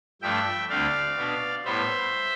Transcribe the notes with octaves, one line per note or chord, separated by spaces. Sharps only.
G2 F3 A3 D4 E5 G5
D2 D3 A3 C4 D5 F5
B2 B3 D4
A2 G3 B3 C5 E5